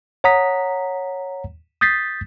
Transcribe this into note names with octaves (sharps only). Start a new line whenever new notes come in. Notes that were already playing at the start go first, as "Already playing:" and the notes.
C#5 F#5 A#5 D#6 B6
D#6 G6 A6 B6 C7